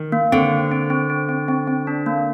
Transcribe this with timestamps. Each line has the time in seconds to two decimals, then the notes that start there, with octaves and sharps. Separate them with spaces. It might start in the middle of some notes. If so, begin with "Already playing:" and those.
Already playing: D#3
0.12 A#3
0.32 D3 C4
0.52 C4
0.72 C4
0.90 C4
1.10 C4
1.29 C4
1.48 C4
1.67 C4
1.87 D4
2.06 A#3